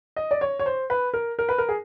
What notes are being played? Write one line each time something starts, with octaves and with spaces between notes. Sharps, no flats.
D#5
D5
C#5
C#5
C5
B4
A#4
A#4
B4
A#4
G#4